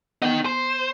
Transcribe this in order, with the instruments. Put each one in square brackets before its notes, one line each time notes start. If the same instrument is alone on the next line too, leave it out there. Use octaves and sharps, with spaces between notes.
[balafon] B3 [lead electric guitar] D#4 G5
[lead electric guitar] C5